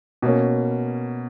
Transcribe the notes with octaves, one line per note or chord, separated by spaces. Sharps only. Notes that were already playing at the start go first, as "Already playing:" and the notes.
B2 A#3 C#4